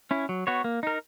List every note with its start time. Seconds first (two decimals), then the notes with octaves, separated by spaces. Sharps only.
0.11 C#4 E4
0.29 F#3
0.47 B3 F#4 C#5
0.64 A#3
0.83 D#4 A#4